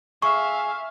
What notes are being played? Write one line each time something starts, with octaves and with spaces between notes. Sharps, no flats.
G#4 E5 F5 C#6